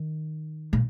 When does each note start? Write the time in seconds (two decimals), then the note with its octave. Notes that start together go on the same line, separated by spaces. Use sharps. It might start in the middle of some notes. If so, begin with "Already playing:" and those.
Already playing: D#3
0.73 A#2